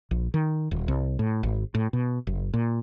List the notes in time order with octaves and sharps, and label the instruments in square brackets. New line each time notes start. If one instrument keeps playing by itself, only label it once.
[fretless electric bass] A#1
D#3
D#1
C2
A2
G#1
A2
B2
F#1
A#2